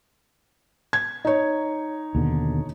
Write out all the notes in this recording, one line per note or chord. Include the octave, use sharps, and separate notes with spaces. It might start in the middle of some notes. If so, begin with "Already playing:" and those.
G#6
D#4 C#5
D#2 B2 D3